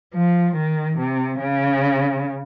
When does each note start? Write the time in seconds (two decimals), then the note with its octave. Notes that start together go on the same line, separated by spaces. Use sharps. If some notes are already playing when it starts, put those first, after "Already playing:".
0.14 F3
0.56 D#3
0.98 C3
1.40 C#3